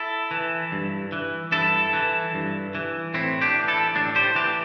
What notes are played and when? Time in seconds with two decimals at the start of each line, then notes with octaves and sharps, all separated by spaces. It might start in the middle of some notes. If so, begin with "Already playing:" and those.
Already playing: E4 A4
0.31 E3
0.72 G2
1.12 E3
1.52 G2 E4 A4
1.93 E3
2.34 G2
2.75 E3
3.14 A2 C4 E4
3.41 D4 G4
3.55 E3
3.68 E4 A4
3.95 A2 D4 G4
4.15 G4 C5
4.35 E3 D4 G4